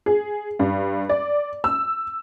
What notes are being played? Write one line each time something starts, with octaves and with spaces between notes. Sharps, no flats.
G#4
G2
D5
E6